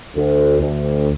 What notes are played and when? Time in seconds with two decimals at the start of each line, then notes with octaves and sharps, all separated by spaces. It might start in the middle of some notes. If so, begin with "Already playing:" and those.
0.16 D2
0.61 D2